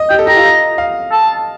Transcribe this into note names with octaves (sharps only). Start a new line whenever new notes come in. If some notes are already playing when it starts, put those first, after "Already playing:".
Already playing: D#5
G4 G5
A4
G4 A#5
F4
D#5
F5
A5